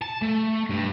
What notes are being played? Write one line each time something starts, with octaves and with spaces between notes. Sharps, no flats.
A5
A3
G2